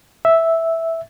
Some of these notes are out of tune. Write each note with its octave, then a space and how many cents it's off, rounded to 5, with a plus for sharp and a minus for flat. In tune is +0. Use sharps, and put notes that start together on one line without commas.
E5 -5